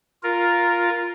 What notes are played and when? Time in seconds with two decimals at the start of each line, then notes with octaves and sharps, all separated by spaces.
0.23 F4 A#4